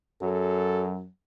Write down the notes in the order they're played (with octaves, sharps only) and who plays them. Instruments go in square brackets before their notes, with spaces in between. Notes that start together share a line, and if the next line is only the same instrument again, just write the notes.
[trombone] F#2 [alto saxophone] F#3 [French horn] A4